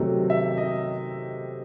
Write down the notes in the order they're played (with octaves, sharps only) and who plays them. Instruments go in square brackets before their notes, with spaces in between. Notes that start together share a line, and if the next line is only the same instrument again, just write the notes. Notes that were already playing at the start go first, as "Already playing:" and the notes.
Already playing: [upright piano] C3 D#3 F#3 A3
E5
D#5